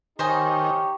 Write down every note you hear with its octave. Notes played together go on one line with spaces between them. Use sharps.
D#3 D#4 G4 C5 C#5 D#5 G#5